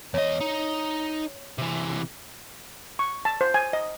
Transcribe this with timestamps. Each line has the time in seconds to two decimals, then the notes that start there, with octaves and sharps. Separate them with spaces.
0.14 E2 C#5 D#5
0.41 D#4
1.58 C3 E3
2.99 C#6
3.25 A5
3.41 C5
3.54 G#5
3.73 D#5